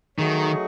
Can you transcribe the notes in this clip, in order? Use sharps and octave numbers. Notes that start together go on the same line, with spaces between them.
D#3 F#3 A3 D#4 G#4 C#5